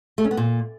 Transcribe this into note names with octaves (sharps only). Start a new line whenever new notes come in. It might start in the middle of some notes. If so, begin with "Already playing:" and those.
A3
C#4
B3
A#2